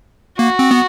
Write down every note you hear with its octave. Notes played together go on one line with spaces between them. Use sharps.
A#3 F#4
C4
B3